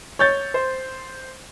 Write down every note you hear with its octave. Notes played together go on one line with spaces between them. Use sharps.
C#5 G6 A6
C5